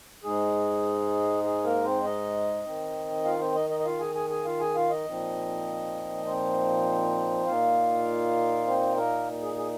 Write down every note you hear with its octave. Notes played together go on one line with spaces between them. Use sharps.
G#2 G#3 D#4 G#4
G#4
A#3 A#4
C4 C5
D#4 D#5
D#3 C4 D#4
F4 F5
C4 C5
D#4 D#5
D#4 D#5
D#5
F4 F5
G#4 G#5
G#4 G#5
G#4 G#5
F4 F5
G#4 G#5
F4 F5
D#4 D#5
A#2 F3 C4 D#4
C4 C5
A#2 A#3 D#4 F4 F5
C4 C5
A#3 A#4
G#4
G#4